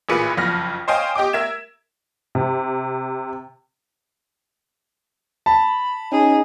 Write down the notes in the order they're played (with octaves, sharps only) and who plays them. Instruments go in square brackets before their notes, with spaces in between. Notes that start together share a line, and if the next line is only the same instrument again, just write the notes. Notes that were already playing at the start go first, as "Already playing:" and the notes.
[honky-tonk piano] A1 A#2 A#3 G#4 B4 C#7
F#1 F2 B5 F6 A#6
C5 C#5 D#5 F5 G5 G#5
G4 D#5 G5 D6
A#4 E5 G#6 E7
C3
[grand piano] A5 [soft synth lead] B5
[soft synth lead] C#4 [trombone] D#4 [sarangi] G#4